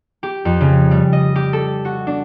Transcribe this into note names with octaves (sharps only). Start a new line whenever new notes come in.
G4
F2
C#3
G3
D#5
G4
A4
F#4
D4